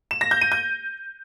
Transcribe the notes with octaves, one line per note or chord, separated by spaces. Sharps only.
E7
A#6
G6
D#7
G6